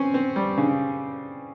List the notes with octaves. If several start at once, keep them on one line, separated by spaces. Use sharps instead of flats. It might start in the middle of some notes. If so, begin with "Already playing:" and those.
Already playing: C4 C#4
C4
G3
C#3